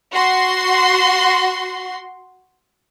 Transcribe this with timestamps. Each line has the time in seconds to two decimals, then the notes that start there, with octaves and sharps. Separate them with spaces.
0.12 F#4 C6